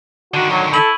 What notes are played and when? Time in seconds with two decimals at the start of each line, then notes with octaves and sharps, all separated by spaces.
0.34 D3 D#3 F#4
0.51 F#3 C#6
0.73 E4 A4 B5 D#7 F#7